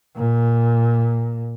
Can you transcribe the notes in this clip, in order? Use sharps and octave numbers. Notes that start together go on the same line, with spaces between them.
A#2